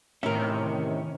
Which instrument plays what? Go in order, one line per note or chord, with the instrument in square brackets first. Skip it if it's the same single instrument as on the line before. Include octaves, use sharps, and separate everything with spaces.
[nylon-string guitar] A2 E3 [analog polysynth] C3 D#3 [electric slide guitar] C#4 [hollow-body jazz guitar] A#4 E5